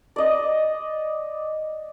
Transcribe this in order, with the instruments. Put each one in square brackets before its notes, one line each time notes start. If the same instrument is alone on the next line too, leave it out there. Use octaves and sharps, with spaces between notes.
[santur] D5 D#5